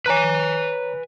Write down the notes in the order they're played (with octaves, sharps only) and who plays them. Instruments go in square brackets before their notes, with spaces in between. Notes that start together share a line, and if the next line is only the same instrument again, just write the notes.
[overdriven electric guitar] B4 G#5 [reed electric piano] C#5 A#5 F#6